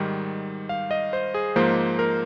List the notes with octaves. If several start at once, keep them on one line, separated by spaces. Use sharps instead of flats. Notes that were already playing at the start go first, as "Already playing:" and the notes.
Already playing: G#2 D#3 G3
F5
D#5
C5
G#4
G#2 F3 A#3 C5
A#4